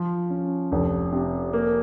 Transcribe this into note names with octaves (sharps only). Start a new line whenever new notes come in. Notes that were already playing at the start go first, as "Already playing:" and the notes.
Already playing: F3
C#4
F1
C3
A#3